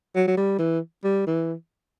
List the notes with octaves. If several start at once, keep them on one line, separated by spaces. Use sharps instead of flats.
F#3
F#3
G3
E3
G3
E3